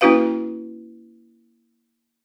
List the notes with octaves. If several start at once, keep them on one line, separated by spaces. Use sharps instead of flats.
A#3 C#4 E4 F#4 B4 F5